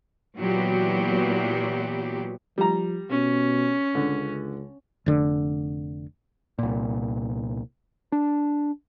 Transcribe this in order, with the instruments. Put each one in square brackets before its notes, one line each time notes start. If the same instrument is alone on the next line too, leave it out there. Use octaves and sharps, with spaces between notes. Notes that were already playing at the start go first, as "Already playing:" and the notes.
[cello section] A#2 E3 F#3 B3 F#4 G4
[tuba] F3 [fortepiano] G3 A#5
[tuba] B2 [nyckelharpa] C#4
[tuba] C#2 [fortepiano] D3
[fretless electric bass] F1 D3
[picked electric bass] C2 A#2
D4